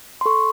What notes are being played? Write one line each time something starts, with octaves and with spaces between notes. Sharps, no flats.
C6
A4 C#6